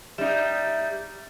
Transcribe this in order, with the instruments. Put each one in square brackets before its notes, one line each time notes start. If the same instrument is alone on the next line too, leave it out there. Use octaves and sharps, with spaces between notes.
[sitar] G3 D#4 [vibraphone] E5